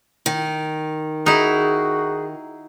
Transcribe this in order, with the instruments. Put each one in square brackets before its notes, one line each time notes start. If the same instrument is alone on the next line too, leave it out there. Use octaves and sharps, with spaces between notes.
[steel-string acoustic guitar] D#3
[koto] D#4 E4 [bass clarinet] F#4 [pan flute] G#4